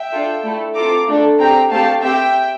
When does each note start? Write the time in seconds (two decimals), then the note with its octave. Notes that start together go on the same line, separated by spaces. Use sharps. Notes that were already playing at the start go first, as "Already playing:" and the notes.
Already playing: E5 G5
0.12 D4 F4 A4
0.43 A3 E4 A4
0.75 C4 F4 A4 A#5 D6
1.07 A3 D4 A4
1.39 C4 G4 G5 A#5
1.70 A3 C4 G4 F5 A5
2.02 C4 G4 E5 G5